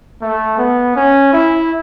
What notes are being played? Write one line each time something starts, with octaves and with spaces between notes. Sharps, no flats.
A3
B3
C#4
E4